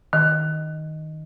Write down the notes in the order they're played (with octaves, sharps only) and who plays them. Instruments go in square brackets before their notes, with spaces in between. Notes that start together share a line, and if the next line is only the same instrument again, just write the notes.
[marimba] D#3